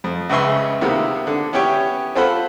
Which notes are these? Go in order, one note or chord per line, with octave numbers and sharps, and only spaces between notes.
F2
C#2 C#3 B4 E5 C6
C3 D#3 A#3 B3
D3
B3 C#4 E4 G4 C#5 G5
C4 F4 A4 C5 F#5 B5